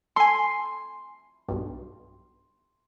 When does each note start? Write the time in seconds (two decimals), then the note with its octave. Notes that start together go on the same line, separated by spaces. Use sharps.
0.16 A4 G#5 C6
1.48 B1 G2